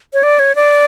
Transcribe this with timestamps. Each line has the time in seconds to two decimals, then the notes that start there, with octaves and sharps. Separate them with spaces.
0.13 C#5
0.23 D5
0.39 C#5
0.55 D5